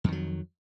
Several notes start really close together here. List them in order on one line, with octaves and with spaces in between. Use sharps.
F2 D#3 F#3